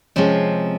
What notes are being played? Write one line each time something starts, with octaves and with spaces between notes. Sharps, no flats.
C3 F3 G#3 C#4